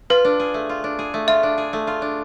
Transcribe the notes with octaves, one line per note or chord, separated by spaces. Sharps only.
F4 B4
D4
G#4
A3
F4
D4
G#4
A3
F4 E5
D4
G#4
A3
F4
D4